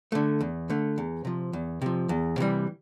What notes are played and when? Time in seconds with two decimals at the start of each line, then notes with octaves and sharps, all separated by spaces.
0.12 D3 A3
0.41 E2
0.70 D3 A3
0.98 E2
1.25 C3 F3
1.53 E2
1.82 C3 F3
2.09 E2
2.38 C3 E3 G3